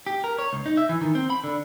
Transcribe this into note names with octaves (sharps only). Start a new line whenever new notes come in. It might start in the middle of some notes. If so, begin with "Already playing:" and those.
G4
A#4
C#5
C#2
D#4
E5
E3
D#3
C4
B5
D3